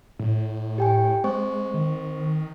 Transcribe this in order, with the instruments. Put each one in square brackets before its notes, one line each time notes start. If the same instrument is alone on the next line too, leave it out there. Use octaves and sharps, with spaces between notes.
[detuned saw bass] A2
[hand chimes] G4 G5 G#5
[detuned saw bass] G#3 [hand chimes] C4 C5 C#6
[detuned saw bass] D#3